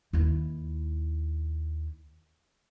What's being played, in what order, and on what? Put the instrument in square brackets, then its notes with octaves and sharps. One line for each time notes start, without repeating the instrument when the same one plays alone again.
[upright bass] D#2 E4